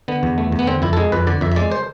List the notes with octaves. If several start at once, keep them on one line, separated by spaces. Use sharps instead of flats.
D3 B3
E2
A3
E2
B3
D3 C4
F2 E4
A4
G#3 G#4
F2 B4
D3 D5
F2 E5
E5
G#3 D5
C5